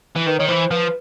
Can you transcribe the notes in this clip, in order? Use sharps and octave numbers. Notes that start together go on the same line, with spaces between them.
E3
D#3 B4
D#3 C#5
E3 C5
F3 B4